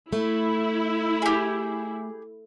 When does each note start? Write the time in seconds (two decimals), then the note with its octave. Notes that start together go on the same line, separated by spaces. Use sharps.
0.13 A3 E4
1.22 G4 G#4